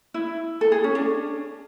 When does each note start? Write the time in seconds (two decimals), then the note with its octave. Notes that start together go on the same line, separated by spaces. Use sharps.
0.14 E4
0.61 A4
0.72 G#4
0.84 C#4
0.95 D4